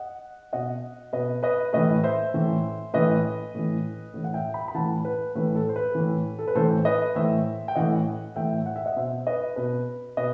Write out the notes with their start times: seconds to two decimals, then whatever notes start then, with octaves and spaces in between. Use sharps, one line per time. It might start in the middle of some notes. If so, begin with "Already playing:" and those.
Already playing: D#5 F#5
0.53 B2 D#5 F#5
1.13 B2 B4 D#5
1.43 B4 D#5
1.73 A2 E3 B4 D#5
2.04 C5 E5
2.34 A2 E3
2.94 A2 E3 B4 D#5
3.55 A2 E3
4.14 A2 E3
4.24 F#5
4.34 E5 G5
4.54 G5 B5
4.68 B5
4.75 A2 E3 F#5 A5
5.05 B4
5.35 A2 E3 B4
5.55 A4
5.69 C5
5.76 B4
5.95 A2 E3
6.39 A4
6.48 B4
6.55 A2 E3 A4 C5
6.85 B4 D#5
7.15 A2 E3 C5 E5
7.68 G5
7.76 A2 E3 D#5 F#5
8.36 A2 E3 E5 G5
8.66 F#5
8.76 E5
8.86 D#5 F#5
8.96 B2 C5 E5
9.27 B4 D#5
9.56 B2 B4
10.17 B2 B4 D#5